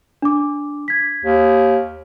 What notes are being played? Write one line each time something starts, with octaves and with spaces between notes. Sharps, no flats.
D4 D6
G#6 B6
D#2